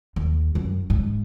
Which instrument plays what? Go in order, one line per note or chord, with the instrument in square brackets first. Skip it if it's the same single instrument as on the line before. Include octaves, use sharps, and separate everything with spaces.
[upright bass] D#2
F#2
G#2